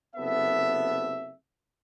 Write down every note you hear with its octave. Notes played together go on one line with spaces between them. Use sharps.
F#1 C3 B3 A4 E5